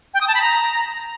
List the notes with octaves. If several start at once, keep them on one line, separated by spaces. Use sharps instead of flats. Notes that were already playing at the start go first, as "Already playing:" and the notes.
G5
D#6
A5
B5
A#5